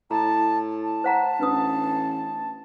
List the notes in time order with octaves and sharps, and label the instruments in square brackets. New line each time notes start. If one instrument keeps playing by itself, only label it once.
[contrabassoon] A2 [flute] A5 [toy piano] A#5
[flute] A5
[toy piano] C5 F#5 A#5
[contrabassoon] A1 [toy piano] D4 B4 D#6